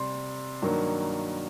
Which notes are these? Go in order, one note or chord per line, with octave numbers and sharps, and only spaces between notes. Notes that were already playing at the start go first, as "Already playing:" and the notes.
Already playing: C3 G3 C6
G2 D#3 F#3 A#3